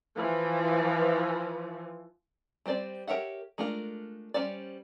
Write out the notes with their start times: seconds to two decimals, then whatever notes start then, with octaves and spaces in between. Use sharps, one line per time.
0.15 E3 F3
2.66 G3 C4 C5 D5
3.07 G4 A#4 C#5 E5 F#5
3.58 G#3 A3 D4 F4 A#4
4.34 G3 C#4 C5 D5